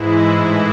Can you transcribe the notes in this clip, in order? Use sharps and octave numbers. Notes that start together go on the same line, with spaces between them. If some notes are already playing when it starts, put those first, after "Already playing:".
Already playing: G#2 E3 G#3 E4
A2 E3 G#3 E4